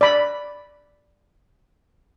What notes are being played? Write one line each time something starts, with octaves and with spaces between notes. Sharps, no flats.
D5 B5